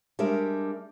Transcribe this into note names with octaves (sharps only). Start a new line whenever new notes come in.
G3 G#3 D4 A#4 E5